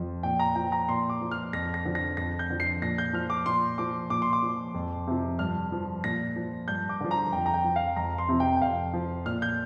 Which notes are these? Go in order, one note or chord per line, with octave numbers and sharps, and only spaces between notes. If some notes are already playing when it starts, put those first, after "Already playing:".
Already playing: F2 F3
A#2 G5
A#5
F3 G5
A#5
A#2 C6
D6
F3
F6
F2 A#6
A#6
D3 F3
A#6
F2 A#6
G6
D3 F3
C7
A#2 A#6
G6
F3 F6
D6
A#2 C6
F3 D6
A#2 D6
C6
D6
F3
F2
C3 F3
G2 F6
F3
A#2 A#6
F3
G2 G6
D6
D3 F3
A#5
F2 G5
A#5
G5
F3
F5
F2 A#5
C6
C3 F3
G5
G5
F2 F5
F3
A#2 F6
G6